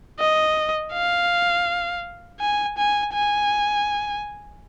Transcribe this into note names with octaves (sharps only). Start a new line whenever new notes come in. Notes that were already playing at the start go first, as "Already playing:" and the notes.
D#5
F5
G#5
G#5
G#5